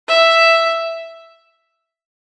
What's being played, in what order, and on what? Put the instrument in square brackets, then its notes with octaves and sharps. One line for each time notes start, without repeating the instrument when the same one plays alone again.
[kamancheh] E5